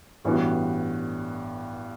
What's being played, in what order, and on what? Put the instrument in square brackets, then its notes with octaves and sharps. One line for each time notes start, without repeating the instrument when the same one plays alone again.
[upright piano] A1 G2 E3 B3 F#4